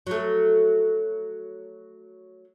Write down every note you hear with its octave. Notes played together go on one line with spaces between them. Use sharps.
F#3 A3